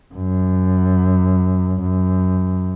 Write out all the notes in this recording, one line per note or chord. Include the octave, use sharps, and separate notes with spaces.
F#2
F#2